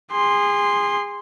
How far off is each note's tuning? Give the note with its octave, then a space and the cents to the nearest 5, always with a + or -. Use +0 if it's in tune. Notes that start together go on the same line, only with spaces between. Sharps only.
G#4 -30 C6 +0